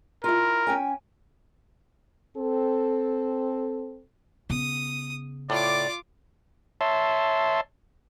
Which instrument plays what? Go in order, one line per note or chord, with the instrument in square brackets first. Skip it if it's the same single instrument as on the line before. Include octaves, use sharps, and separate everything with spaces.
[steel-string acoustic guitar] E4 F4 [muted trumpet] A#4
[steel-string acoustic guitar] C#4 G5 G#5
[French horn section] C4 A4
[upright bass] C#3 B3 [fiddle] D#6
[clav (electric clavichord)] A2 [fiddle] F4 D6 [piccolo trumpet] D5
[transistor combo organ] C#5 E5 A5 C6